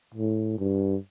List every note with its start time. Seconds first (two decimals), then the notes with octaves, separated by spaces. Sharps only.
0.14 A2
0.58 G2